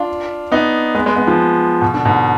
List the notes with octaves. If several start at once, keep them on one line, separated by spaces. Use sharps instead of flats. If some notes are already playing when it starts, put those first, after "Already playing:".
Already playing: D4 F4
B3 D#4
G#3 B3
G#3 B3
G#3 B3
F3 G#3
B2
D3
G#2 B2